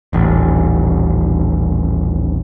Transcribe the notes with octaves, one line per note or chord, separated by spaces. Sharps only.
D#1 A1